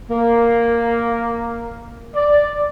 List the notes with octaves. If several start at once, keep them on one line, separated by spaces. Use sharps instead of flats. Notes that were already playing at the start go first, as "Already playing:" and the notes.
A#3
D5